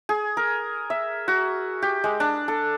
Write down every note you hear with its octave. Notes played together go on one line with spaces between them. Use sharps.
G#4
A#4
E5
F#4
G4
G#3
D4
A4